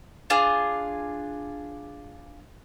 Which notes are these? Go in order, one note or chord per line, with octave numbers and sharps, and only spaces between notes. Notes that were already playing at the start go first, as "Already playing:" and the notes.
D4 F4 G#4